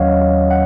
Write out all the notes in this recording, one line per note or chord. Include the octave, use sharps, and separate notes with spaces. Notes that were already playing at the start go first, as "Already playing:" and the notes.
Already playing: D#2 D#3 F#3 C#4 C#5 D#5 F5 F#5
F#5